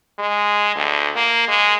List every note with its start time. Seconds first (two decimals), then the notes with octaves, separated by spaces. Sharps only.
0.19 G#3
0.76 D2
1.16 A#3
1.48 G#3